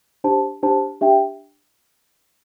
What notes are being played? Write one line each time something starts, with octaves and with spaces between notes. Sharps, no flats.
D4 G4 C5 A5
D4 G4 C5 A5
D4 G4 E5 G5